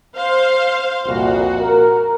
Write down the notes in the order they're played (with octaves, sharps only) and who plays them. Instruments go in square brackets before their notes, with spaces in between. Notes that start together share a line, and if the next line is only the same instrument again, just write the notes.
[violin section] C5 F5
[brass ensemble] C2 F2 A#2 [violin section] F#4
[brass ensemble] A#4